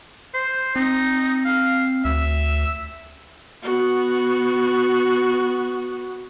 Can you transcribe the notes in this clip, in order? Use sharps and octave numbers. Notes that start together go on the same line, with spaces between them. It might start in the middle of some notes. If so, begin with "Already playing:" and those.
C5
C4 D#4
F5
D2 E5
B3 F#4